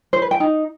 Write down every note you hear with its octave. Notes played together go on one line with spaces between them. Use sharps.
C5
B4
G5
D#4